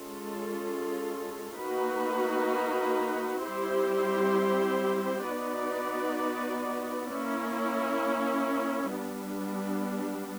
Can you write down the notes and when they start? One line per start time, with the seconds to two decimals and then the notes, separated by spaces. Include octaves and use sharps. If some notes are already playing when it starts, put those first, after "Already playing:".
Already playing: G#3 C#4 F4 A4
1.60 A#3 D#4 F#4 B4
3.44 G3 C4 E4 G4 C5
5.26 B3 D#4 F#4 B4 D5
7.11 A#3 C#4 E4
8.94 G3 B3 D4